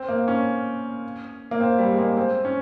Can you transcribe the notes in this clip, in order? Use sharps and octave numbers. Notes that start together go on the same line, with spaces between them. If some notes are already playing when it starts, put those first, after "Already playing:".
Already playing: C4
A#3
C#4
A#3
C4
G3
G#3
A#3
C4
C#4